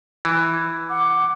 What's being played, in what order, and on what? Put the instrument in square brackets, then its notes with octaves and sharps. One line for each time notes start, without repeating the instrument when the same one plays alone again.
[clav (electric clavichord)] E3
[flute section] F#5 D6